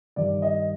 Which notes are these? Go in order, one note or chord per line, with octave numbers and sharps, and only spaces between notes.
G2 D#3 G3 D5
D#5